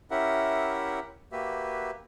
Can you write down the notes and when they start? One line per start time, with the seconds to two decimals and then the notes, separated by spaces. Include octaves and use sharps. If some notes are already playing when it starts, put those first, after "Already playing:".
0.11 C#4 E4 G4 A#4 E5 F#5
1.32 A#3 F#4 G4 B4 E5